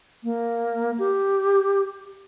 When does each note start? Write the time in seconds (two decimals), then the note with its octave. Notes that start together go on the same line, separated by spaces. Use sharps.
0.24 A#3
0.99 G4